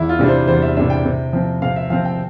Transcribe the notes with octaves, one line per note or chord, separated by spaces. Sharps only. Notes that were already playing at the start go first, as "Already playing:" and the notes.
Already playing: E2 E4
F4
C3 G3 D4
C5
E2 C5
E5
C3 G3 D4 E5
G5
C3
F3 C4
C3 F5
E5
F3 C4 F5
G5